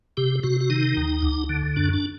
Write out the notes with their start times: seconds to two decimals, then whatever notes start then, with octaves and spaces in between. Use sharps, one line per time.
0.17 C3 G4
0.43 C3 F#4
0.60 F#4
0.70 D#3 D#4
0.97 D#2
1.22 D2
1.49 D3
1.76 F#2 D4
1.93 D4